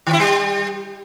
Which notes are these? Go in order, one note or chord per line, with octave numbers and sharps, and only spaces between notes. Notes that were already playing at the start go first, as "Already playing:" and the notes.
D#3
E4
G3